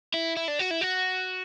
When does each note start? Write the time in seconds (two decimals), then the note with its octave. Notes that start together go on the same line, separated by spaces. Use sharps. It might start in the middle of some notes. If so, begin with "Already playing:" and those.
0.14 E4
0.37 E4
0.48 D4
0.59 F#4
0.71 E4
0.81 F#4